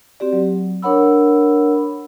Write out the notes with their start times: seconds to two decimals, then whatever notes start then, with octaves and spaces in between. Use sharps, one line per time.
0.20 C4 F#4 G4 D5
0.33 F#3
0.82 D4 A#4 C#5 F#5 B5 E6